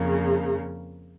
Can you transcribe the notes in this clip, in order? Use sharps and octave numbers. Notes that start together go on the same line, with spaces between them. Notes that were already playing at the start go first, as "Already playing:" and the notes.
Already playing: F2 C#3 A#3